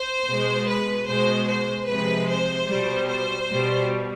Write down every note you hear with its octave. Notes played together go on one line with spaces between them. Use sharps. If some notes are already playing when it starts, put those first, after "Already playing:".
Already playing: C5
B2 G#3
B4
B2 G#3 C5
C5
C3 F3 G#3 B4
C5
B2 G3
C5
B2 G3